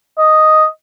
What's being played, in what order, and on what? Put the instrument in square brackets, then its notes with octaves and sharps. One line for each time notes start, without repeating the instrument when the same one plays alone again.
[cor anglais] D#5